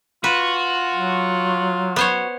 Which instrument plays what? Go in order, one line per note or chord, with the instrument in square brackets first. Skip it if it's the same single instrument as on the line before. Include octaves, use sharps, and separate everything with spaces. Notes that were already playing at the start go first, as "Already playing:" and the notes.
[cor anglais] F4 [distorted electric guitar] F#4 [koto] B4
[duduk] F#3
[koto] B3 C5 C#5